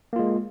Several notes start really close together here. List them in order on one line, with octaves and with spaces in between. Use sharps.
A#3 F4 G#3